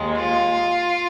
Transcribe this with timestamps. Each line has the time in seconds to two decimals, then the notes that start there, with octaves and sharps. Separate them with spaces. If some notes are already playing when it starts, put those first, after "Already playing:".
Already playing: D#2 D#3 G#3
0.17 F4